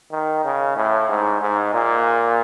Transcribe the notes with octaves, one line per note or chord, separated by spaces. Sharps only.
D#3
C#3
A2
G#2
G#2
A#2